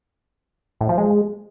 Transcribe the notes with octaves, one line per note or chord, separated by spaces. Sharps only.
A2
F3
G#3